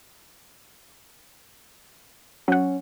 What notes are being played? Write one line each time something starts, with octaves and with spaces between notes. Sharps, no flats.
F#3 C#4 F#5